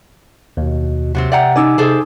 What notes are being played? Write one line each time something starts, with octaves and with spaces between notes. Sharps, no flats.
D#2 B2
C3 F#3 B3 C4
D5 E5 F#5 G5 A#5
D#4 G#5 D6 E6
C3 G#4 A4 C5